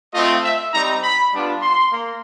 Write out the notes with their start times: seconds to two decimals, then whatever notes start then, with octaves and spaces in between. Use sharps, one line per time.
0.14 A3 C4 F4 D#5
0.44 E5
0.74 G3 C4 D#4 A#5
1.03 B5
1.33 G3 B3 D4 F4
1.62 C6
1.92 A#3